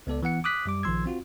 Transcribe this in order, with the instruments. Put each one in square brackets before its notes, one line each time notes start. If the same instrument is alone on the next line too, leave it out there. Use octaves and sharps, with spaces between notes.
[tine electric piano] C#2 B3 A4 D5
E3 B3 F#5 C#7
D6 D#6 F#6 B6
F#2 G3 D6
A#1 D#3 F3 C6 E6 G#6
C4 F4 F#4